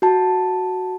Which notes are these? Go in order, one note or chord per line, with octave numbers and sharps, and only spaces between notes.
F#4 A5